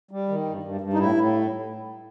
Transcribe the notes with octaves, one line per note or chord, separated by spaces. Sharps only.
G3
D#3
G2
G2
G2
D#4
A2 E4
A2